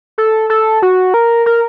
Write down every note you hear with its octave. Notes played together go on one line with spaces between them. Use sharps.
A4
A4
F#4
A#4
A#4